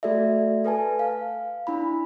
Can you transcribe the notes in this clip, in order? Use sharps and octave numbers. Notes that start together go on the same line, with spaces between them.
A3 F#4 A4 D5 E5
A4 B4 G#5 A5
F5
D4 E4 B5